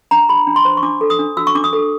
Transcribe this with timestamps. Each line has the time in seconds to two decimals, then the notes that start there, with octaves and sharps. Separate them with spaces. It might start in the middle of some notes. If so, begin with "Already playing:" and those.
0.11 D4 A#5
0.29 G4 B5
0.47 D4
0.56 C6
0.65 C5
0.77 C#6
0.83 D4 D6
1.01 A4
1.10 D#6
1.19 D4
1.37 F#4 E6
1.47 C#6
1.55 D4 D6
1.64 D#6
1.73 A4